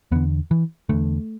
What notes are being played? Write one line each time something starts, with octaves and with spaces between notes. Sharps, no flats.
E2 D3 B3
E3
E2 D3 A3